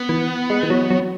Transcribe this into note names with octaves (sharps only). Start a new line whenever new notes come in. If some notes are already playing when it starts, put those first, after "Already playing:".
Already playing: B3
E3
G#3
E3
F#3
F#3